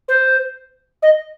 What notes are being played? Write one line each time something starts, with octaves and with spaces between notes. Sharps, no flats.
C5
D#5